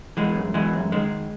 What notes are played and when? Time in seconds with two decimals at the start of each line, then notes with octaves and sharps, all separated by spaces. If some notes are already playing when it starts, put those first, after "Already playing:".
0.17 E3 G#3
0.35 F#2
0.54 E3 G#3
0.73 F#2
0.92 D#3 G#3